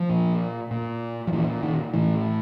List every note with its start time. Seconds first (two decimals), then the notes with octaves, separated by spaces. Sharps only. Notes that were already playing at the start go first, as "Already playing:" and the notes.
Already playing: F3
0.09 A#2
0.71 A#2
1.27 F3
1.32 A#2 E3
1.63 D#3
1.94 A2 E3